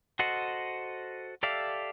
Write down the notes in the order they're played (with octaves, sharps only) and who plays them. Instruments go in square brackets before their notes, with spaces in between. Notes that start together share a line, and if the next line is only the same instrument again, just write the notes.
[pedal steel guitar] F#4 A4 C5 D#5 F#5
G4 A4 D5 E5 F5